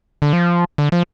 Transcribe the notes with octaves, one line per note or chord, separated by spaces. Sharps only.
D3
F3
D3
F3